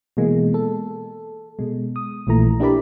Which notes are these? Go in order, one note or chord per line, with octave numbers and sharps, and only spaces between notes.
B2 E3 G#3 A#3
A4
B2 G#3
D#6
A#1 A#2 E3 A3 A#5
D4 E4 G4 A#4 D5 B5